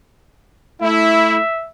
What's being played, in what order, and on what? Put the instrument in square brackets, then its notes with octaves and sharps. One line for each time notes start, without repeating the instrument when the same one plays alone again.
[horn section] A3 E4 [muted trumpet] E5